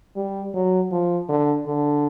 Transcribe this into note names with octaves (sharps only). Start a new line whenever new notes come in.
G3
F#3
F3
D3
D3